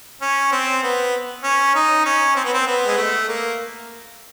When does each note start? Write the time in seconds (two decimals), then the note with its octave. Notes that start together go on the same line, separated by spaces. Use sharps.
0.22 C#4
0.52 C4
0.83 B3
1.43 C#4
1.75 D#4
2.05 C#4
2.36 C4
2.45 B3
2.54 C4
2.67 B3
2.86 G#3
2.98 A3
3.28 A#3